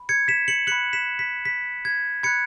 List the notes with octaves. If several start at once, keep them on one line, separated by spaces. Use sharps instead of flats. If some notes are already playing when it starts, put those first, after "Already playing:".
Already playing: B5
G#6 C#7
B6 E7
C#7 F#7
B5 F#6 C#7 F#7
B6 E7
B6
B6
G#6
B5 F#6 G#6 C#7